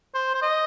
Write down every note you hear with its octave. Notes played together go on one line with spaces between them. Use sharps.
C5
C5
D#5